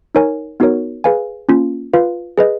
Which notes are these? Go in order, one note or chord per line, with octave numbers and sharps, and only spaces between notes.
D#4 A#4 C#5 G#5
B3 D#4 F#4 A#4 C#5
G#4 B4 F5 G#5
A#3 C#4 F4
F4 B4 F5
G#4 B4 D#5